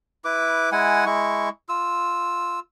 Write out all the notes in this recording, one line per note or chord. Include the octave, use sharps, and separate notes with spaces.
E4 B4 D6
G#3 E4 F#5 G#5
G#3 E4 C#6
F4 E6